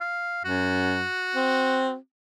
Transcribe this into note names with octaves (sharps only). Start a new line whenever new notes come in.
F5
F#2 F#4
C4